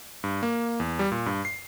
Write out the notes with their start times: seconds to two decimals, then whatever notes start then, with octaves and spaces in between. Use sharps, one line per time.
0.24 G2
0.43 A#3
0.80 E2
0.99 G3
1.12 A#2
1.26 G2
1.45 C7